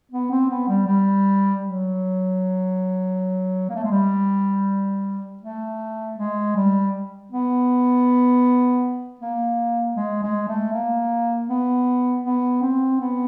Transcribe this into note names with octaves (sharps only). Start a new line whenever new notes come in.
B3
C4
B3
G3
G3
F#3
A#3
A3
G#3
G3
A3
G#3
G3
B3
A#3
G#3
G#3
A3
A#3
B3
B3
C4
B3